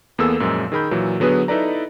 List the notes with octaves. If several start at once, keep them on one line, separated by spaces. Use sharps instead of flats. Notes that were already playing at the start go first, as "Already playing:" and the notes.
E2 A#3 B3 G#4 A4 E6
F#2 A#2 F3 G#3
D#3 G#4 A#4 B5 G6
A#2 E3 F#3
D3 F#3 B3 G#4 B4
D#4 E4 A4 B4 D5 A#5